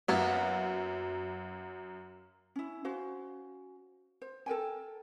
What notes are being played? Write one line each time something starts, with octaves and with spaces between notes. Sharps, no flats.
F#2 F#3 A#3 B3 E4
C#4 E4
C#4 F#4 C5 F5
C5
A4 A#4 G5 G#5